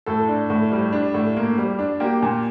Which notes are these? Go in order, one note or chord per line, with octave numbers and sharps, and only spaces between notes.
A2 A4
D4
A2
G3
D4
A2
A#3
G3
D4
A#3 G4
A#2